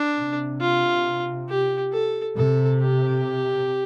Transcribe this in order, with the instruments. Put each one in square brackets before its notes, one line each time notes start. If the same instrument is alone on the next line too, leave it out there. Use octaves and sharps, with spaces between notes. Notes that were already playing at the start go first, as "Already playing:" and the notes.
Already playing: [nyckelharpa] D4
[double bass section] C3
[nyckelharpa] F4
G4
A4
[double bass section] C3 [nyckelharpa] A4
[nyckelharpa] G4